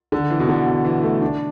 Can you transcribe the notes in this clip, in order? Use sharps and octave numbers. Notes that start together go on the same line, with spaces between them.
D3
E3
B2
D3
B2
E3
A3
D4